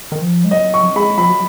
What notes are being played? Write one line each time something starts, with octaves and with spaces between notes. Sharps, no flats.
D#3
F3
G#3
F#3 D#5
C#6
G#3 B5
F3 B5
F#3